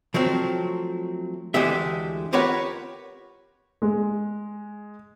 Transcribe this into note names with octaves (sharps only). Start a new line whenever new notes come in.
F3 F#3 A3 C4
D2 E3 G#3 A3 G4 E5
F4 G4 A#4 B4 C#5 F#5
G#3